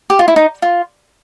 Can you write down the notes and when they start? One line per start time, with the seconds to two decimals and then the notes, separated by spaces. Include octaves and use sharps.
0.10 G4
0.19 F4
0.28 E4
0.36 D#4
0.62 F4